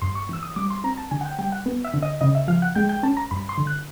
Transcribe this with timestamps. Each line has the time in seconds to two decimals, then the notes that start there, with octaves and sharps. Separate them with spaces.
0.02 G2 C6
0.15 C#6
0.29 E3 E6
0.43 D#6
0.56 G3 D6
0.70 C6
0.84 C4 A#5
0.97 A5
1.11 D3 G#5
1.21 F#5
1.25 G5
1.39 G3 G5
1.52 F#5
1.66 B3
1.84 E5
1.94 D3
2.02 D#5
2.21 C#3 D#5
2.35 E5
2.48 F3 F5
2.62 F#5
2.75 G#3 G5
2.89 G5
3.03 C#4 A5
3.17 A#5
3.31 G2 B5
3.49 C6
3.58 D3
3.67 F#6